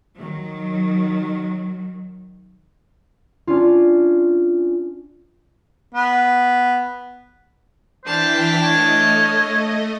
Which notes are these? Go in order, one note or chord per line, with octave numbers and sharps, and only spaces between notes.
D#3 F#3
C#4 D4 F4
B3
E3 D4 C5 G5 A5 F6 B6
A3 C#5 D#5